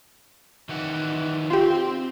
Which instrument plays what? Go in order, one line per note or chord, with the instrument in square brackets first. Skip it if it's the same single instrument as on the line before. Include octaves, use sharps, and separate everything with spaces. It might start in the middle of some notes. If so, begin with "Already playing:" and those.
[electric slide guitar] D#3 E3 F#5
[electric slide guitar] C4 [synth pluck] F4 G4